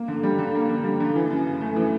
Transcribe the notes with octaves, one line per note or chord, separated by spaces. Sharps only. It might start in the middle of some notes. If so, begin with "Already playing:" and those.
Already playing: A#3
D3
G3
D3
A#3
D3
G3
D3
E3
F#2
C#3
A3
E3